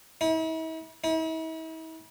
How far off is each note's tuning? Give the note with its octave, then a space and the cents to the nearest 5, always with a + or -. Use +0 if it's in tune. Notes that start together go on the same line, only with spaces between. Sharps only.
E4 -45
E4 -45